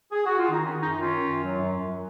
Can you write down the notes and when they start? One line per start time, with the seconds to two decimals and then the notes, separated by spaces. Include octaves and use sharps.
0.12 G#4
0.25 F#4
0.37 F4
0.50 D#3 D#4
0.65 D#3 C#4
0.80 F#2 D#4
0.95 D#3 C#4 F4
1.11 D#3
1.26 F#2
1.42 F#3
1.57 F#2
1.72 F#2
1.87 F#3